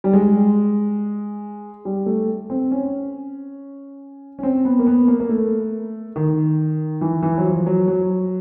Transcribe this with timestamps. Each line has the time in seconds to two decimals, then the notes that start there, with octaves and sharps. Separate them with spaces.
0.04 G3
0.13 G#3
1.85 G3
2.06 A3
2.50 C4
2.71 C#4
4.39 C#4
4.43 C4
4.65 B3
4.79 A#3
4.87 B3
5.08 A#3
5.20 A#3
5.29 A3
6.16 D#3
7.01 E3
7.23 E3
7.38 F#3
7.44 F3
7.66 F#3
7.88 F#3